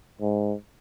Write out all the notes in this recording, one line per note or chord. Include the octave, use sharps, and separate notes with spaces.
G#2